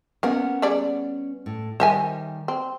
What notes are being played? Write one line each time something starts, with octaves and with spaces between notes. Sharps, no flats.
A#3 B3 C#4 A#4 F#5
G3 G#4 D5
A2
D#3 G3 C5 D#5 E5 G#5
C4